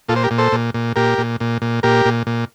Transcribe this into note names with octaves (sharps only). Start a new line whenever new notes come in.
A#2 F4 A4
C5
G4 A#4
A#2
A4 C5
A#2
A#2
A#2 G4 A#4
A#2
A#2
A#2
A#2 G4 A#4
A#2
A#2